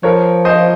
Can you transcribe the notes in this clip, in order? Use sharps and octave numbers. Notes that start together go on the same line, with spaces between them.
F3 A#4 C#5
C5 D#5